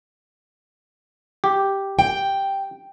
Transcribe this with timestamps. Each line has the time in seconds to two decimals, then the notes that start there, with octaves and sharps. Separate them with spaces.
1.44 G4
1.99 G5